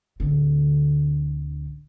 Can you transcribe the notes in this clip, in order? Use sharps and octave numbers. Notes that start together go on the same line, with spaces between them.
D1 D3